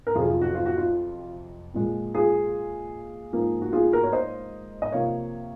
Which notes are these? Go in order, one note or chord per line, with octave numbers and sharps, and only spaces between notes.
A#4
F2 C3 F#3 F4 G#4
F4
F#4
F4
F#4
F4
A#2 F3 G#3
F4 G#4
G#2 F3 A#3
F#4
F4 G#4
F#4 A#4
C#5
C5 D#5
D#5
C3 F3 A#3 C#5 F5